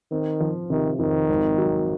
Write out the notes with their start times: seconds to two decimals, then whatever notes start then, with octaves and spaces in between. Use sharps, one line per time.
0.11 D#3 C4
0.40 F3
0.70 C3 D#3
0.99 F2 D#3
1.29 G#1
1.58 F#3